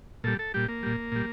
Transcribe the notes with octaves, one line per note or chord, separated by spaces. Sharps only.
A#2 G3 A4
A4
A#2 G3 G4
A#3
A#2 G3
A#2 G3